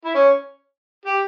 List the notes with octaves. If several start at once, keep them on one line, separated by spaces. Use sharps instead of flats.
E4
C#4
G4